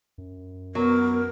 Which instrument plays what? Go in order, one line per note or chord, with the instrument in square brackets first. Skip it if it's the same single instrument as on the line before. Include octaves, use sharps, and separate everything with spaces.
[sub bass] F#2
[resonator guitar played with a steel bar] F#3 [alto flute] B3 [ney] A#4